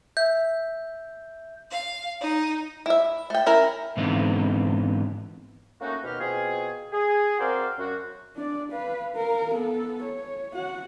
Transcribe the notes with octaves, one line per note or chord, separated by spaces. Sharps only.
E5 G6
F5
D#4
E4 E5
A3 G5
C#4 E4 A#4
G#2 D3 E3 B3 C4 D#4
A3 A#3 C#4 D#4 F#4
D#2 B2 D#4 G4 F6
B2 C4 F4 G#4
G#4
C4 F#4 A#4 C5 D5 F5
F#2 F#4
D4 D5
B4 F5
A#4 F5
B3 A4
C#5
F#4 F#5